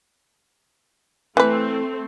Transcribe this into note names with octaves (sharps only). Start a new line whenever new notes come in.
E3 A3 C4 B4